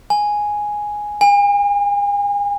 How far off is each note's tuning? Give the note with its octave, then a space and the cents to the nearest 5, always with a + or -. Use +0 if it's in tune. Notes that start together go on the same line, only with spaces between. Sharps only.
G#5 +0
G#5 -40